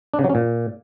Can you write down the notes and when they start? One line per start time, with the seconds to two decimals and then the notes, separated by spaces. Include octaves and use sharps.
0.14 D4
0.19 C#3
0.24 F#3
0.29 C#4
0.35 A#2